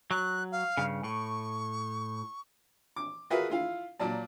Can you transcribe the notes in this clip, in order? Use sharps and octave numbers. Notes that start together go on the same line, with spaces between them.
F#3 F#6
F5
G2 C#3
A2 C#6
D6
F4 F#4 G#4 A#4 B4 E5
E4 F4 F5
A#2 F#3 D5 A5